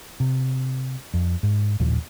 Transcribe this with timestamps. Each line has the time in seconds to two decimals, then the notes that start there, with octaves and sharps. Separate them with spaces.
0.20 C3
1.14 F2
1.43 G#2
1.80 A1 D#2 A#2 F3